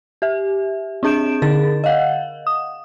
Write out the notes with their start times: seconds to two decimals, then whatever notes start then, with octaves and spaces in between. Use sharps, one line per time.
0.22 G4 E5
1.03 C4 D4 G#4 G6 D7 E7
1.42 D3 G#4 A#4 A6
1.84 D#5 F5 F#5
2.47 D#6